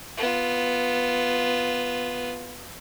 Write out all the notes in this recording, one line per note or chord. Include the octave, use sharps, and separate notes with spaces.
B3 F4